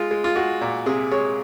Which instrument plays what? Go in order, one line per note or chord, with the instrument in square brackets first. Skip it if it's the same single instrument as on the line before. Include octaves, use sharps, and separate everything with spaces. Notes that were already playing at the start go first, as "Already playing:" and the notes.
Already playing: [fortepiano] G#3 F4
G#3
F4
G#3 F#4
A#2
C3 G#4
G#3 C#5